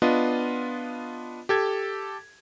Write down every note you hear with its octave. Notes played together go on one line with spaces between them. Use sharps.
B3 D4 F4 D#5
G4 A4 G#6